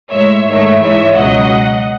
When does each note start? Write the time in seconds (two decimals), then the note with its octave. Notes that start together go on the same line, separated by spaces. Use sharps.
0.12 A2 G#3 C#5 E5
0.46 G#2 D#3 A3 C#5 E5
0.81 G#2 E3 G#3 C#5 E5
1.16 C#2 B2 F#3 D#5 F#5